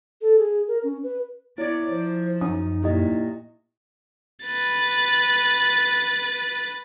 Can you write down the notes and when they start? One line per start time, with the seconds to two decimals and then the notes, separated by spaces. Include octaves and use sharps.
0.21 A4
0.39 G#4
0.68 A#4
0.84 C#4
1.03 B4
1.58 B3 E4 C#5 D5
1.91 F3 C5
2.41 F#2 D#4 D#6
2.83 A#2 E4 G4 D#5
4.43 B4 A6